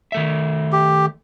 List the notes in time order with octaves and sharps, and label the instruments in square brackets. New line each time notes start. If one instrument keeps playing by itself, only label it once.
[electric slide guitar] D#3 A3 E5
[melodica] G4